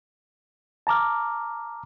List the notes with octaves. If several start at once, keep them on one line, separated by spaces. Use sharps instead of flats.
A5 A#5 D6 F6